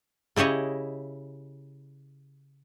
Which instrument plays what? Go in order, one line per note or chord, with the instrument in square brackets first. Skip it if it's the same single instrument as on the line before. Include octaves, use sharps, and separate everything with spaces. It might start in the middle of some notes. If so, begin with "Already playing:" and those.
[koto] C#3 E4 G4 C#5 D#5